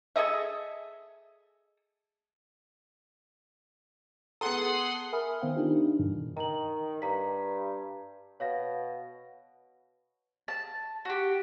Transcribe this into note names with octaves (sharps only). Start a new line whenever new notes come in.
G#4 A4 D#5 E5
B3 G#4 A4 F#5 C6 D#6
A#4 E5 G#5 B5 D#6 F6
D#3 B3 C5 F5 G5
D4 D#4 F4 G4 A#4 C5
D4
G2 B2 D3 E3
D#3 A#5 F#7
G2 A#5 B6
B2 C#5 F5 A#6
A5
F#4 G4